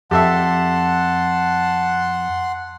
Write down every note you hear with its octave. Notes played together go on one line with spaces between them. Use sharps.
F2 G4 A4 E5 F#5 A5 C6